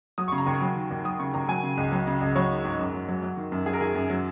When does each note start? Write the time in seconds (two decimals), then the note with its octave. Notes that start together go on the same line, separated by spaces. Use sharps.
0.18 F#3 D#6
0.28 C#3 C#6
0.38 A#5
0.46 D#2 C#6
0.61 F#3
0.76 D#3
0.91 D#2
1.05 F#3 D#6
1.19 C#3 C#6
1.34 D#2 A#5
1.48 F#3 G#5
1.63 C#3
1.77 C#2
1.92 F#3
2.07 C#3
2.21 C#2
2.36 F#3 C#5
2.50 D#3
2.65 G#2
2.79 F#2
2.94 F#3
3.08 F#3
3.23 F#3
3.37 D#3
3.52 F#2
3.66 F#3 G#4
3.73 A#4
3.81 D#3 G#4
3.95 F#2
4.10 F#3